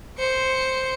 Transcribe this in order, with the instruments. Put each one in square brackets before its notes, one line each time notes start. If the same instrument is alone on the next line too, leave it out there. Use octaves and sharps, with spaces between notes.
[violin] C5 C#7